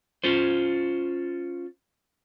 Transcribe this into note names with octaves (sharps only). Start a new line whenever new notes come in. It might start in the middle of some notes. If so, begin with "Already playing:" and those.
C#4 F4 C5